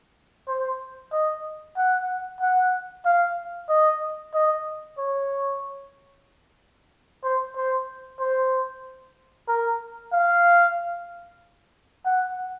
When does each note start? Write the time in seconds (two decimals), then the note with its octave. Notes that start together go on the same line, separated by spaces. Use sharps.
0.48 C5
1.12 D#5
1.77 F#5
2.41 F#5
3.05 F5
3.69 D#5
4.34 D#5
4.98 C#5
7.23 C5
7.56 C5
8.20 C5
9.48 A#4
10.12 F5
12.06 F#5